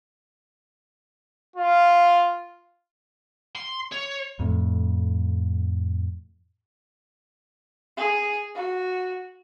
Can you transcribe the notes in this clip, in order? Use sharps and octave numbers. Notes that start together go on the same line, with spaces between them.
F4
C6
C#5
F2 A2
G#4
F#4